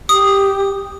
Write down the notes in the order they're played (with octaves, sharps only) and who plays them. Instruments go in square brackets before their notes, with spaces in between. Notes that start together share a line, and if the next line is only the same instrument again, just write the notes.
[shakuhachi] G4 [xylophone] D#6